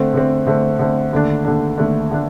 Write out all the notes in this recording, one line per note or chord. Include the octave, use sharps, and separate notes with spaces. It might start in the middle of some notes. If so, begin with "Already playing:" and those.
Already playing: D3 A3 C4
D3 A3 C4
D3 A3 C4
D3 A3 C4
D#2 D3 A3 D4
D#2 D3 A3 D4
D#2 D3 A3 D4
D3 A3 D4